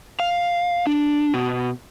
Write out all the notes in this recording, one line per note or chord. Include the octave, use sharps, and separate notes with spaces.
F5
D4
B2